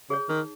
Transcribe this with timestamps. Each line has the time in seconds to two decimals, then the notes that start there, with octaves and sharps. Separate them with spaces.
0.10 C#3 G#4 C#5
0.29 D#3 D#4